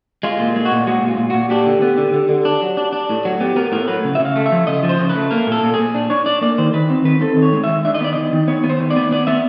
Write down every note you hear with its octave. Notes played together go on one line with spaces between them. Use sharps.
G#3 F4
A#2
G#3
F#4
A#2
G#3 F#4
A#2
F4
A#2
A#2 F#4
D4 G4
D3
B3
D3
D3
D3
D4
F#3
D4
D4
A2
F#3
B3 G4
B3 A#4
A2 A#4
F#3 B4
C#3
C#3 E5
F5
A3
E5
F3
C#3 D#5
F3
C5
C#3
B4
A3
A#3 A#4
A#2 A4
A#2
A#2 G#4
D4
D4 C#5
D4 D5
A#3 D5
D#3 C5
D#3 B4
C4
D#3 B4
C4 A4
D#3
C#5
G#3
E5
D#3
D4 E5
D#5
B3 D5
D#3 D#5
D#3
B3 C#5
B3
C5
D#3
D5
B3
B3 D5
B3 E5